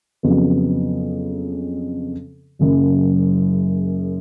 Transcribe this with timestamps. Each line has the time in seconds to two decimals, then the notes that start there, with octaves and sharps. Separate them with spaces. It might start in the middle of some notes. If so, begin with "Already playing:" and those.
0.23 F2 C#3 F#3 B3
2.59 F#1 F#2 C#3 F#3